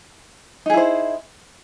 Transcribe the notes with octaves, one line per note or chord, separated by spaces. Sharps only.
D#4 E4 G#4 C5